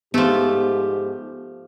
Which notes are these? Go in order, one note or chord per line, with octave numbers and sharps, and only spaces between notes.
G#2 F3 A3 B3 G4